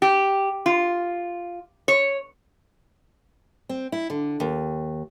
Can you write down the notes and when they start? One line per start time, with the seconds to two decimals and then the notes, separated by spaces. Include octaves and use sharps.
0.02 G4
0.66 F4
1.88 C#5
3.69 C4
3.92 E4
4.10 D3
4.40 D#2